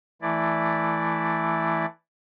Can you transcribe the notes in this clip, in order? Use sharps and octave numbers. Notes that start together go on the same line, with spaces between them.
E3 A3 E4 D5